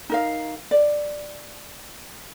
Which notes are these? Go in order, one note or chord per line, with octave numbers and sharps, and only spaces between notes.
D#4 A#4 F5
D5